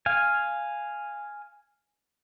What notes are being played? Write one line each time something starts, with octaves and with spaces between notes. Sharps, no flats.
F5 G#5